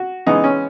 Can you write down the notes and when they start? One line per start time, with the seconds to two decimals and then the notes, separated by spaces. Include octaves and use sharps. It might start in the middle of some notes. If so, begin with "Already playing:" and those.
Already playing: F#4
0.26 C#3 E3 G#3 B3 D#4
0.44 C#4